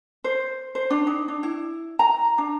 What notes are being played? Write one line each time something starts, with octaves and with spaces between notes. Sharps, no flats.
C5
C5
D4
D#4
D4
E4
A#5
D4